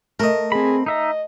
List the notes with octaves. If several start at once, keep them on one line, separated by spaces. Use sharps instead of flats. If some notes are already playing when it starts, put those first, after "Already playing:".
A3 A#4 D#5
C4 G#4 B5
D#4 D#5 E5 A#5